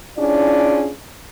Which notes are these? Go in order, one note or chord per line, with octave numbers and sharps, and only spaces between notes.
C#4 D4 E4 F4 G#4 D5